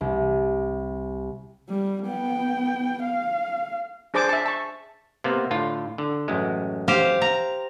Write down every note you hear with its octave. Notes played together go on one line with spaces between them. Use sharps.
C2
G3
B3 G5
F5
D4 G#4 C5 A5 D6
E5 A5
A5 C#6
C3 A#3 B3
A2 D3 F4
D3
A1 F#2 G#3
G4 C5 F5
A#5